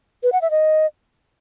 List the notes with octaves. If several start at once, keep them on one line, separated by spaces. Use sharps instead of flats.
B4
F#5
E5
D#5